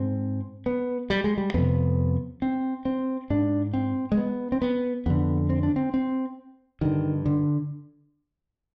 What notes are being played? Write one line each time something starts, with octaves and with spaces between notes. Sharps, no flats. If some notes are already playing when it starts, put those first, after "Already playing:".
Already playing: G#2 C4
B3
G3
G#3
G3
F2 C3 B3
C4
C4
G#2 D4
C4
G#3
B3
C4
B3
F2 D3 B3
C4
D4
C4
C4
G2 D3 D#3
D3